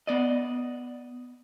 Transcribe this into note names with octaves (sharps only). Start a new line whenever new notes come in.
B3 D5 D#5